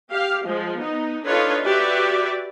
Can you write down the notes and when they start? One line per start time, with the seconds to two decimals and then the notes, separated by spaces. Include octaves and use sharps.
0.10 G4 F5
0.46 F3 G#3
0.79 B3 D#4
1.26 D4 D#4 F4 A4 B4 C#5
1.66 F#4 G4 B4 D5 E5